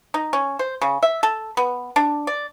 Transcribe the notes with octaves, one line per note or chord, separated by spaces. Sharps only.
D#4
C#4
C5
C#3
E5
A4
B3
D4
D5